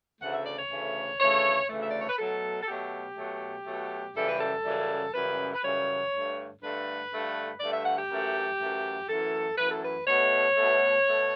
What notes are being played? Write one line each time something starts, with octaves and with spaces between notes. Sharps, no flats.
D2 C#3 E3 A3 F#5
E5
D5
C#5
D2 C#3 E3 A3
D2 C#3 E3 A3 C#5
D2 C#3 E3 A3
E5
D5
C#5
B4
B2 F#3 A3 A4
A4
B2 F#3 A3 G4
B2 F#3 A3
B2 F#3 A3
F#2 C#3 E3 G3 A4
B4
A4
F#2 C#3 E3 G3
F#2 C#3 E3 G3 B4
B4
F#2 C#3 E3 G3 C#5
G2 D3 A3
G2 D3 A3 B4
G2 D3 A3
G2 D3 A3 D5
E5
F#5
G4
F#2 E3 A3
F#2 E3 A3
F#2 E3 A3 A4
F#2 E3 A3 B4
A4
B4
B2 A3 C#5
B2 A3
B2 A3